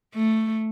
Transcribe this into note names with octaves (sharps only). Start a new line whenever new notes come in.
A3